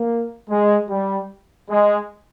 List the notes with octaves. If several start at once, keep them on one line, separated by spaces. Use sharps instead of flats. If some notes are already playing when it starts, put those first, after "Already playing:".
Already playing: A#3
G#3
G3
G#3